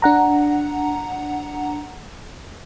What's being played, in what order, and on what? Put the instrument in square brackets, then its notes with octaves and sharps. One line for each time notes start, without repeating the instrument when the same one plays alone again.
[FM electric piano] D4 F#5 A#5